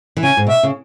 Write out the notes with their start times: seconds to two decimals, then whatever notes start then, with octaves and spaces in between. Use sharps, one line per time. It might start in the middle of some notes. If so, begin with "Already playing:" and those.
0.17 E3
0.23 C#3 G#5
0.37 G#2
0.47 B2 E5
0.63 C#3